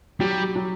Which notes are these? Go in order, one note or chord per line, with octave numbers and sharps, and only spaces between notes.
F#3 G3
F#3